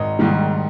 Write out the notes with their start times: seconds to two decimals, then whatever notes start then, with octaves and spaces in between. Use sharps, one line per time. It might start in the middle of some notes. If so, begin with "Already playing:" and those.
Already playing: G#1 D#5
0.19 G#2 D#3 G3